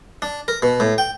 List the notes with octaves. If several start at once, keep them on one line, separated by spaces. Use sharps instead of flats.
D4
A#4
B2
A2
G5